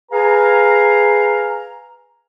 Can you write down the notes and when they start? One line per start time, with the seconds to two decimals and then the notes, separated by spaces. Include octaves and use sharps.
0.12 G#4 B4 F5 G#5 A#5